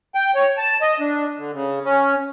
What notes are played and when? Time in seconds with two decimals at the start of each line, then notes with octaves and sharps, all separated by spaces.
0.15 G5
0.35 C#5
0.58 A5
0.81 D#5
1.00 D4
1.38 D3
1.53 C#3
1.84 C#4